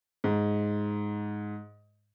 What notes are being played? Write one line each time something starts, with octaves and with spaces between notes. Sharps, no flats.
G#2